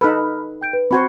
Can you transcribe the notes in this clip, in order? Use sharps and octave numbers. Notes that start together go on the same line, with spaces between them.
D#4 A4 B4 B5 F6
G5 G6 D7
B4
C4 F#4 C5 B5 G#6